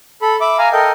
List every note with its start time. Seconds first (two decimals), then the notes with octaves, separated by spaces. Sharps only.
0.22 A4 B5
0.41 E5 B5 D6
0.58 F5 G#5 A#5
0.73 A4 A#4 D#5 G5